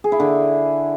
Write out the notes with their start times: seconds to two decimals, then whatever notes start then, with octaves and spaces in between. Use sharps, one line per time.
0.04 G#4
0.12 E4
0.20 D3